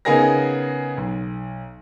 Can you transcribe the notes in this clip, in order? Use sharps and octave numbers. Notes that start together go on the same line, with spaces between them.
C#3 B3 D#4 G#4 A#4 A#6
B1